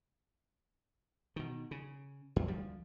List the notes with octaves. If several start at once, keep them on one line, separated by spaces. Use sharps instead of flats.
B2 D#3
C#3
F2
D2 F3 G3